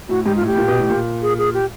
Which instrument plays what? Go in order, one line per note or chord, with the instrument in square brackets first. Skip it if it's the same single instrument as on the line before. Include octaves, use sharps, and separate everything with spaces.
[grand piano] A2 [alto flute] F#4
[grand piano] G#2 [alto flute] G4
[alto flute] F4
[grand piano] A2
[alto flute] G4
[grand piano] A2
A#2
B2
A2
A#2
[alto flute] G#4
G#4
G4